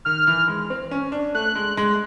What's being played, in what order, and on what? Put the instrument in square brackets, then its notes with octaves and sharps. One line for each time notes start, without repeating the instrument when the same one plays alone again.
[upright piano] D#3 [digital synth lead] F6
[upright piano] E3
G#3
C4
C#4
D4
[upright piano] A3 [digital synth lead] F#6
[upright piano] G#3
G#3